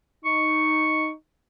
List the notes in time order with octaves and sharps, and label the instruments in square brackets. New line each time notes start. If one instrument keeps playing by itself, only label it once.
[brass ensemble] D#4 [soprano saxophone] C#6